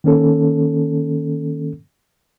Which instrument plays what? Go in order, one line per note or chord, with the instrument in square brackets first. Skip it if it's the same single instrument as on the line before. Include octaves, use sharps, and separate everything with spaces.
[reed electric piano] D#3 A#3 C#4 A4